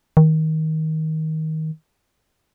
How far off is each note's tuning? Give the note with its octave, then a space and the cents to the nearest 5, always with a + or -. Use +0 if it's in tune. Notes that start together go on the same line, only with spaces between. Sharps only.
D#3 +20